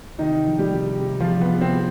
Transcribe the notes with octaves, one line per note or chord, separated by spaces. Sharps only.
C3 D#3 D#4
F3
G3 G4
C3
C3
F3 F4
C3
B3
C3
C4